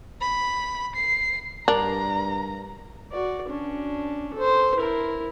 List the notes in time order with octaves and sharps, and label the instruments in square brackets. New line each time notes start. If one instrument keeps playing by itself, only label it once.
[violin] B5
C7
[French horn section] G2 [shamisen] D4 [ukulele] A#4 [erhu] A#5
[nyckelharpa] F#4 D5
C#4 D4
A4 C5
E4 A#4